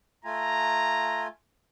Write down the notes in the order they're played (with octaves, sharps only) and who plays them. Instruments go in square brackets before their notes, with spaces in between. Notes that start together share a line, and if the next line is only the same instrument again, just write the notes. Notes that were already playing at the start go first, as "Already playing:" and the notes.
[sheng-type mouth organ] A3 F4 G#5 [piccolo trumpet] A#5